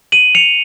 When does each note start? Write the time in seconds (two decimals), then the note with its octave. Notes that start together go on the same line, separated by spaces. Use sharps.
0.12 D#7 F#7
0.35 C#7 F7